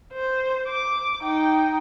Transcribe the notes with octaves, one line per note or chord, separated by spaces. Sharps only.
C5
D6
D#4 G5